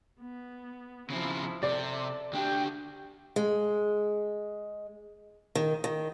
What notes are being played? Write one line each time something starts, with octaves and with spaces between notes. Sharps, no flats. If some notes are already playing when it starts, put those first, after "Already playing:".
B3
C#3 F3 C4 E4
C3 A4 D5
D2 D4 G4 G5
G#3
D#3
D#3